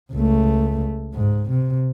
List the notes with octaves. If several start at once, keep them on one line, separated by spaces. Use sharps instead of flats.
C#2 A3
G#2
C3